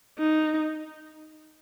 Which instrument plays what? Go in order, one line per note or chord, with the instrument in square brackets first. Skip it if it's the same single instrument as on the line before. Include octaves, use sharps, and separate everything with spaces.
[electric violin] D#4